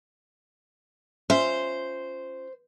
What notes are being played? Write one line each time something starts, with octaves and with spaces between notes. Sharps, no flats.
C#4 F4 C5 E5